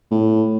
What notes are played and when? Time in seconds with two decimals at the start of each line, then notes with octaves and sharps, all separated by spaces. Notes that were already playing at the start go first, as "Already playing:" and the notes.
0.11 A2